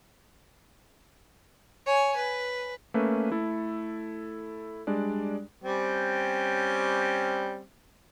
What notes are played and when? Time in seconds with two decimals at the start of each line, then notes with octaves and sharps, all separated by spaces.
1.86 C#5 G#5
2.16 B4
2.94 A3 A#3 C#4 B4 E5
3.31 A3 E4 A4
4.87 G3 G#3 D4 D5
5.64 G3 C4 C#4